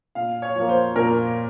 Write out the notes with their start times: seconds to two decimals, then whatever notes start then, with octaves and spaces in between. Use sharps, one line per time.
0.15 A#2 F5
0.42 C#5
0.56 F3 A#3
0.69 C5
0.96 A#2 A#4